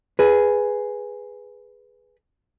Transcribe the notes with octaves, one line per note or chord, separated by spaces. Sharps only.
G#4 B4